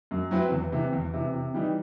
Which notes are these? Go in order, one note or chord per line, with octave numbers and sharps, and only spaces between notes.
F#2
F#3 C4 E4 B4
E2
C3 E3
E2
C3 E3
C3
E3 G3 D#4